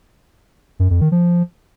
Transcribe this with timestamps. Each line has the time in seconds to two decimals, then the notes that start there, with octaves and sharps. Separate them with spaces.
0.79 F#2
0.90 F2
1.01 D#3
1.12 F3